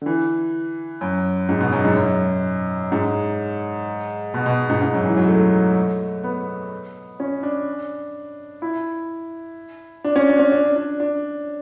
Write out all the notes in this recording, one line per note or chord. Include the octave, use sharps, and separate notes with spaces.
D3
E3
F#2
G#2
B2
F#2
G#2
F#2
G#2
B2
B2
G#2
G#2
F#2
E3
F#3
A3
B3
C#4
D4
E4
D4
C#4
D4
C#4
D4
D4
D4